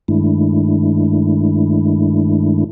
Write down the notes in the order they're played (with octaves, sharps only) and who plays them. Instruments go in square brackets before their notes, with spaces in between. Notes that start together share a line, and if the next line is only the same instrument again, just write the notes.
[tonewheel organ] G2 D#3 G#3 A3 D4 E4